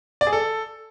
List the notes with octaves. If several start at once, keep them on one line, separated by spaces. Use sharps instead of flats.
D5
G#4
A4